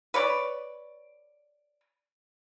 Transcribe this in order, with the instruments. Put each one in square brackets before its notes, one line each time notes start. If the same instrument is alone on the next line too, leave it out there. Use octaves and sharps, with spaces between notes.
[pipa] B4 C#5 D5